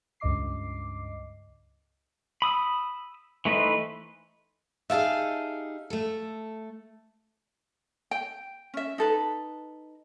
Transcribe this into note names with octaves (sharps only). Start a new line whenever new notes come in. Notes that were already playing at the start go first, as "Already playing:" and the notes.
C#2 G2 D#5 D6 C7
B5 D#6 E6
E3 A3 D#4 B4 C5
D#4 G4 G#4 E5 F5 A5
A3 A4
G5
C#4 E5
D#4 A4 B4